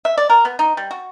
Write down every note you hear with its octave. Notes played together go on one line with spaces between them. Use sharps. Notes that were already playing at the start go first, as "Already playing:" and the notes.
E5
D5
A#4
B3
D#4
G3
F#4